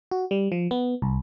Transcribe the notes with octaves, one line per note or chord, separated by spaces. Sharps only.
F#4
G3
F3
B3
C2